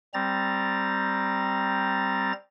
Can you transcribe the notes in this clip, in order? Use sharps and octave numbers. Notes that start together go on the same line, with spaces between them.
G3 C4 A#5 A6